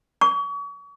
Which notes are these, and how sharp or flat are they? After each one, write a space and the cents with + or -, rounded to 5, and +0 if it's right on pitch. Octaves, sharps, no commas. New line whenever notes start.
C#6 +40